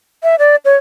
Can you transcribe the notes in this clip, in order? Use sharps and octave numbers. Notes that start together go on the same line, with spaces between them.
E5
D5
C#5